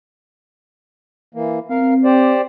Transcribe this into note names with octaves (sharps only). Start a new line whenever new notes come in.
E3 A#3
C4 A#4 F5
G4 C5 D5